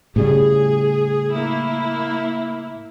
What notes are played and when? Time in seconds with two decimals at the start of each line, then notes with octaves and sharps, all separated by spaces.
0.16 A2 C#3 G3 G#4
1.34 A#3 E4